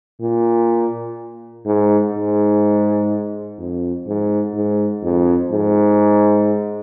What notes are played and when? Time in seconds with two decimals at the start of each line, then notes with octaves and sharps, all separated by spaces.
0.21 A#2
1.65 G#2
2.14 G#2
3.59 F2
4.07 G#2
4.55 G#2
5.03 F2
5.51 G#2